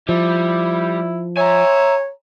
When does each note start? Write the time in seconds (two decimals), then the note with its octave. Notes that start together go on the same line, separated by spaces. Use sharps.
0.09 F3 G3 E4
1.37 C#5 E5 G#5 A#5